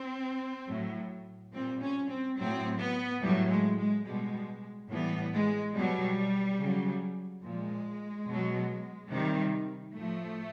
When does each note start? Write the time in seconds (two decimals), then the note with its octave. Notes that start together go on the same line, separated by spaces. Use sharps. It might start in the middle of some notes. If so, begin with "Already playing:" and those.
Already playing: C4
0.68 A2 F#3
1.52 A#2 G3 C4
1.82 C#4
2.09 C4
2.37 A2 F#3 C4
2.79 B3
3.21 A2 F#3 G3
3.49 G#3
3.78 G#3
4.05 B2 G3 G#3
4.89 A2 E3 G3 B3
5.32 G#3
5.74 B2 F#3 G3
6.59 C#3 F#3
7.43 A#2 F3 G#3
8.27 B2 F#3
9.11 C3 D#3 G3
9.95 A2 F3 A3